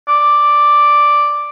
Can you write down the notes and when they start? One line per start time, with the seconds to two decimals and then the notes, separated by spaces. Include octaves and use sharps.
0.08 D5